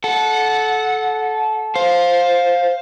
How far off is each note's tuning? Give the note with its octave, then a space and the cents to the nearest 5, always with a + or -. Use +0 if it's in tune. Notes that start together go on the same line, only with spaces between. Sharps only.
A4 -20 F#5 -10
C5 +5 F5 +10